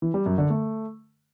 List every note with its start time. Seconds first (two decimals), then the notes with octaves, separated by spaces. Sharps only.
0.02 E3
0.14 G3
0.26 F#2
0.38 D3
0.50 A3